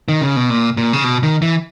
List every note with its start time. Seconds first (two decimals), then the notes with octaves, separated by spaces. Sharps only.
0.08 D#3
0.22 C#3
0.36 B2
0.50 A#2
0.77 A#2
0.93 C#3
1.04 B2
1.23 D#3
1.42 E3